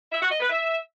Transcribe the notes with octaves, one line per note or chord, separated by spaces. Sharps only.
E5
F#4
D#5
B4
E5